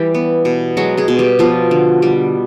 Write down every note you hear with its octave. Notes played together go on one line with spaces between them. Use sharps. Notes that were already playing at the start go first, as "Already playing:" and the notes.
Already playing: E3 G3 G4
B3
B2
F#3 G#3 F#4
G#3 G#4
B2
G3 G4
F3 B3 F4
D3
G3